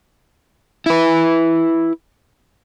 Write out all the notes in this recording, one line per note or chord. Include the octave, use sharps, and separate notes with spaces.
E4 B4